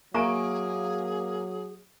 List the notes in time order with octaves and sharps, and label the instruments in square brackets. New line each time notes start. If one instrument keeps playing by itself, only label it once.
[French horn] F#3 [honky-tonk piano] A#3 G#5 D7 [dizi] G#4 [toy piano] E5 A#5 C#6